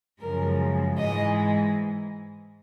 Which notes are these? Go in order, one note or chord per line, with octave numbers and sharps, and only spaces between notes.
F#2 C#3 F3 G#3 A#4
G#2 E3 G#3 D#5